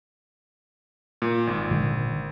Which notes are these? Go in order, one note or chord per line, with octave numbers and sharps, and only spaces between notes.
A#2
G#1
A#2 D3 G#3